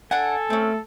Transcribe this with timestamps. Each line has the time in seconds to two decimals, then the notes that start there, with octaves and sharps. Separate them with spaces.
0.11 D4 A4 F#5 G#5
0.50 A3 C4 C#4